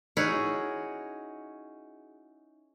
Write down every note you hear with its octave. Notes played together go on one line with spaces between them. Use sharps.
C#4 D#4 E4 F#4 G#4